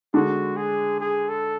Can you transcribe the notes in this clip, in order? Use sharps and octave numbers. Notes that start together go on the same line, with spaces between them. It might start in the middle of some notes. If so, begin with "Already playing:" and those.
D3 G#3 D4 F#4
G#4
G#4
A4